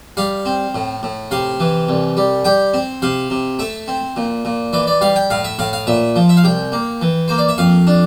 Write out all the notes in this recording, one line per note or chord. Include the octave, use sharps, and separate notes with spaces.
G3 F5
C4
A2
A2
C3 F5
E3
C2
G3
G3 G5
C4
C3 F5
C3
A3 E5
C4
A#2
A#2
E3 D5
D5
G3 F5
G5
A2 F5
E5
A2 F5
F5
A#2 E5
F3
E5
F5
C2 G5
A#3
E3
A#3 C5
D5
E5
F2 F5
D4